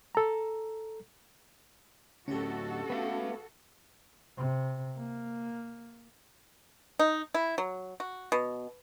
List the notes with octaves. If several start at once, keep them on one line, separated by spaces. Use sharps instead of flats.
A4 A#5
D2 A2 C#4 F#4 G4 A4
A3 B3 B4 F5
C3
A#3
D#4
E4
F#3
F#4
B2